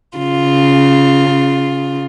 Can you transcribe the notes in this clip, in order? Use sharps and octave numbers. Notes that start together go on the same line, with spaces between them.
C#3 F4